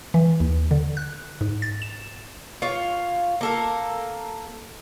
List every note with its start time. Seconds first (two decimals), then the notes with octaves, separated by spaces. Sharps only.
0.14 E3
0.40 D#2
0.71 D3
0.97 F#6
1.41 G#2
1.62 A6
1.82 E7
2.62 F4 C#5 F5
3.41 A#3 A4 A#4